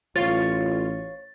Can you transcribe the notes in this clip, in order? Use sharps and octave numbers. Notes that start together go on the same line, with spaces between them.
A1 F4 C#5 F5 A6